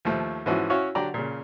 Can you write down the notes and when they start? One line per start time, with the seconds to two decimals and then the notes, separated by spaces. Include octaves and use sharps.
0.05 D#2 F3 A3
0.46 G#2 E3 F3 C#4 E4 F#4
0.70 C#4 E4 F#4 C#5 F5
0.95 D3 F#3 G4 D5 A#5
1.14 A#2 C#3